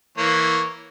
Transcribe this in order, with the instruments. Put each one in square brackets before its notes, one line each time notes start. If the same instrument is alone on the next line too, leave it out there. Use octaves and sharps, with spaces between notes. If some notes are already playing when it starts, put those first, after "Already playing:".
[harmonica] E3 A#3 C#5